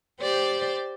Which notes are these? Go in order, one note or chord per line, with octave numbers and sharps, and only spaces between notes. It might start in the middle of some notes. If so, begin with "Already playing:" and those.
G4 C5 D5